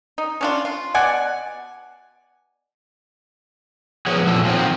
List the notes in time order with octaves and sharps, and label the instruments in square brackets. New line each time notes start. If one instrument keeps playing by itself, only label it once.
[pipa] D#4
C#4 D4 F4
F4
B2 D5 F#5 G#5
[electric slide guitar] F3 F#3 B3 G#4 C#5
E2 A#2 F3 A4
D#3 F3 F#3 C4 F4